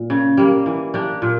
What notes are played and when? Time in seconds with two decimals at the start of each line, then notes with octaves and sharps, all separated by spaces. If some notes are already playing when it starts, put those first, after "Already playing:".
Already playing: A#2
0.10 C#3
0.37 G3 A#3
0.66 E3
0.94 A#3 D4 G4
1.22 A#2